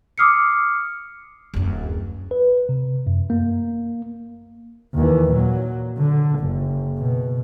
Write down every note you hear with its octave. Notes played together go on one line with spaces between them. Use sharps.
D6 D#6 F6 C7 C#7
D1 F#2
B4
C3
F#2
A#3
D#2 E3
A#2 F#3
D3
F#1
B2